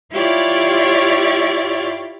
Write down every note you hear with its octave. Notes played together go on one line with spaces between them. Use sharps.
E4 F4 G4 C#5 D5